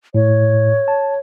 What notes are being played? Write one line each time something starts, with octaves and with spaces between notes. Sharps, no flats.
A2 C#5
A5